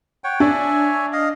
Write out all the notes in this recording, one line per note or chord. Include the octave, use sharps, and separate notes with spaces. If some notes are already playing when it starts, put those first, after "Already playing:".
C#5 F#5 G5
D4 C#5 E5 G#5
D#5 F5